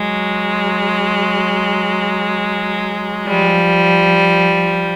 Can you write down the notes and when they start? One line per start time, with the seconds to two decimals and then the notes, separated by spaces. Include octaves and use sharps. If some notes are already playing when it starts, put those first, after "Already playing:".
Already playing: F#3 G#3
3.27 F3 G3